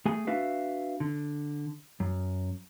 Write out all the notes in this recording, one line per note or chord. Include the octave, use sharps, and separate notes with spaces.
A3 G#4 G#5
D4 F#4 B4 E5 F5
D3
F#2